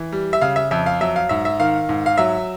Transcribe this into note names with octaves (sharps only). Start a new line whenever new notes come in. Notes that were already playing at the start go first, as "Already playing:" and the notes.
Already playing: E3
G3
E5
C#3 F5
E5
F2 E5
F5
F#3 E5
F5
G#2 E5
E5
D#3 F5
G#2
F5
F#3 E5